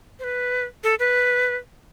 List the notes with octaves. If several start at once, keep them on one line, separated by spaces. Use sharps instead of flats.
C5
B4
A4
B4